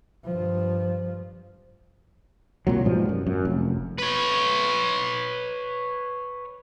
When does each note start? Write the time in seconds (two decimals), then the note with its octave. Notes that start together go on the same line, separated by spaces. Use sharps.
0.25 G2 F3
2.67 C2 A#2 F#3
2.85 G#2 B2 F3 G3
3.09 F#2
3.27 F#2
3.45 F1
3.98 B4 C#5